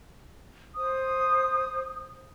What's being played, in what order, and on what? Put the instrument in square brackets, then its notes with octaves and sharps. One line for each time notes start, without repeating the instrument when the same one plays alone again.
[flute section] C5 D#6